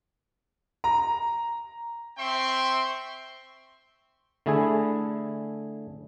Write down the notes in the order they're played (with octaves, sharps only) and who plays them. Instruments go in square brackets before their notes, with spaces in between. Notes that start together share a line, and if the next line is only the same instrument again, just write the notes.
[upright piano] A#5
[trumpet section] C4 E5 G5 C6 C#6
[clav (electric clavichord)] D3 A3 E4 G#4 G#5